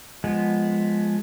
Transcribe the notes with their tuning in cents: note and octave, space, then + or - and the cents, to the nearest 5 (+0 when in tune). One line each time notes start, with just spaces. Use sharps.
F3 +0 G#3 +0 B3 +0